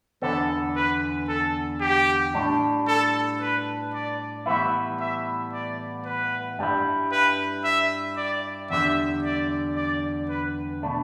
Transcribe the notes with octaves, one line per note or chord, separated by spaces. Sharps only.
E2 D3 B3 A4
B4
A4
G4
A2 G3 D4
A4
B4
D5
A2 E3 G3 B3 E4 E5
E5
D5
B4
G2 G3 E4
B4
E5
D5
E2 D3 G3 E5
D5
D5
B4
B2 A3 D4